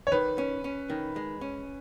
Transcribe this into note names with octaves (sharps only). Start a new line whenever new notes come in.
C#5
D#3 B4
C#4
C#4
D#3
G#3
C#4